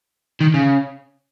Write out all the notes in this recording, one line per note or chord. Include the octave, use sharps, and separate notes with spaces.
D#3
C#3